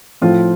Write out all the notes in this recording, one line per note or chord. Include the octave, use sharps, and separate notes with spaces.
A2 F3 C4 F4